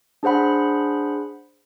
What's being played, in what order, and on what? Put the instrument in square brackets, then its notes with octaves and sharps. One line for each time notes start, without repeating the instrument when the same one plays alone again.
[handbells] D4 G#4 C5 F#5 B5